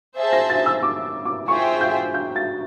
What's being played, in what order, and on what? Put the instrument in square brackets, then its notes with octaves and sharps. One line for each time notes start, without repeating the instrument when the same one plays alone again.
[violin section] G#4 C5 E5 A5
[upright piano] A#6
A6
E6
D6
D6
[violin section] F4 G#4 C5 E5 G5 [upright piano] C#6
[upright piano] G6
G6
A6